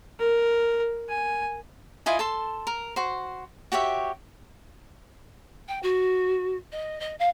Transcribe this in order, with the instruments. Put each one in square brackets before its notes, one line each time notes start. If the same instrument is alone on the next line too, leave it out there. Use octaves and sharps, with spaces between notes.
[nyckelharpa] A#4
G#5
[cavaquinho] E4 F4 D#5 G#5
A4 A5 C6
A#4
F#4 C5
F#4 G4 C#5 E5
[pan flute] G5
F#4
D#5
D#5
F5